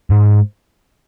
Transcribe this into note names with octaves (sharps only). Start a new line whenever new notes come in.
G#2